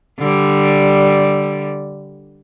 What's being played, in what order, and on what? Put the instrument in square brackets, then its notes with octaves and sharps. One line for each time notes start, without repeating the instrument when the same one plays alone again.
[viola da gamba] D3 G3